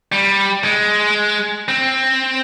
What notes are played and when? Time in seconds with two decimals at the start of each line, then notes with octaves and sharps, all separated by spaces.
0.12 G3
0.64 G#3
1.68 C4